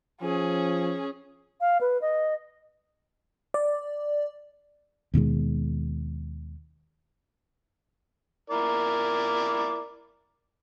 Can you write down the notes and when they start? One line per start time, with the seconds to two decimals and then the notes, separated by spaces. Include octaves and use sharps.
0.21 F3 C#4 G#4
1.61 F5
1.81 B4
2.02 D#5
3.54 D5
5.14 D#2 B2 D#3 G#3
8.50 E4 A#4 D5